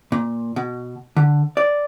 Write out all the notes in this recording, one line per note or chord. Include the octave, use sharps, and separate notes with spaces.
A#2
B2
D3
D5